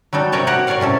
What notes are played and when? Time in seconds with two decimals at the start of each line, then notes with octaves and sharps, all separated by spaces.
0.13 F#3 G3 D#4 A4
0.32 C3 D#4 A#4 C#5 G5 A5
0.47 F#4 G4 A#4 C#5 F#5
0.67 A#4 C#5 D5 F5 F#5
0.80 A2 C3 C#4 A4